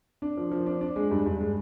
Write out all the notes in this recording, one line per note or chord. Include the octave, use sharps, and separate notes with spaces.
D4
F3
F3
D4
D4
G#3
G2
G2
G#3